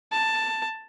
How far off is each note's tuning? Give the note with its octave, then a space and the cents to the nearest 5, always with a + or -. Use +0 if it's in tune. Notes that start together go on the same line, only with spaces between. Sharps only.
A5 +10